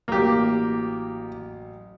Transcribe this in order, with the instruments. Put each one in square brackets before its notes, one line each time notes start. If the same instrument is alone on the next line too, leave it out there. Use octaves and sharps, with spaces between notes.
[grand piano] A1 F#3 [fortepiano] A#3 G4